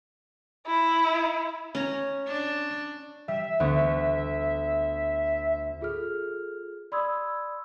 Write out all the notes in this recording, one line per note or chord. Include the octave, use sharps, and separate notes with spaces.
E4
C#4 A#5
D4
G3 E5
D2 B3 C#6
F4 G#4 A4 F6
D5 B5 C6 D#6 E6 G#6